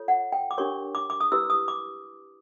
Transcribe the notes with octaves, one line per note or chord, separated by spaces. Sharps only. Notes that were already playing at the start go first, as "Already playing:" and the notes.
Already playing: F4 A4 C#5
F#5
G5
D6
D4 G4 A#4 C#5 C#6
D6
D6
D#6
E4 G4 B4 E6
D#6
D6